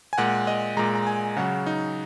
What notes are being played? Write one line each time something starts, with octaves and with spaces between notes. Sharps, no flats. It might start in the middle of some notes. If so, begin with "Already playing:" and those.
G#5
A#2 G#3 F#5
D#5
A#2 G#3 A#5
A#5
G#5
C#3 F#3 F#5
D#4